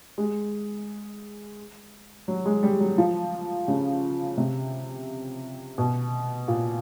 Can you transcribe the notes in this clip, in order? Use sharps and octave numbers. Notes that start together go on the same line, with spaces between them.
G#3
F#3
G#3
G3
F#3
F3
C#3
C3
B2
A#2